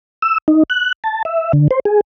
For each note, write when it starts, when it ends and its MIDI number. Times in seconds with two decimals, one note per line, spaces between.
0.22 0.38 88
0.48 0.63 63
0.70 0.92 90
1.04 1.23 81
1.25 1.52 76
1.53 1.68 50
1.71 1.80 72
1.85 2.01 68